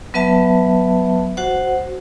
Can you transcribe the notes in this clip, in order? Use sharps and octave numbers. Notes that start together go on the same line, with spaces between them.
F#3 B3 B4 E5 A5
F#4 C5 F#5